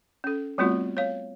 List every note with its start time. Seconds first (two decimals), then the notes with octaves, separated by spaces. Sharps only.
0.24 C#4 A4
0.58 G3 A3 B3 C4 F4 F#4
0.97 C#5 F5